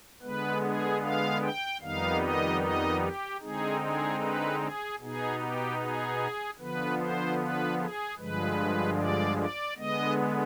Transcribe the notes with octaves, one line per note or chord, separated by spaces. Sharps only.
D3 G#3 B3 B4
G#4
F5
G5
F2 D#3 G3 B3 D#4 F5
D#5
D#5
G4
D3 G#3 C4 D#4 G#4
G#4
B4
G#4
B2 B3 D#4 G#4
G4
G#4
D3 F3 B3 B4
C5
B4
G#4
G2 D3 F3 G#3 B4
D5
D5
D3 G#3 B3 D#5